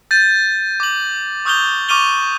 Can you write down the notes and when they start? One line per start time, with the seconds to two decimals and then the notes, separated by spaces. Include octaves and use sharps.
0.11 G6 A6 D#7
0.80 D6 F#7
1.45 C#6 D#6 F6 G6 F7 G7
1.89 C#6 D6 F6 D#7 F7 G7